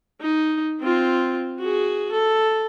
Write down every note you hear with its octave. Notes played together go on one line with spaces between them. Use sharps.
D#4
C4 F4
F#4 G#4
A4